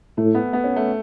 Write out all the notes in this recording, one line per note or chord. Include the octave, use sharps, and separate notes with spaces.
A2 A3
B3
B3
C#4
A3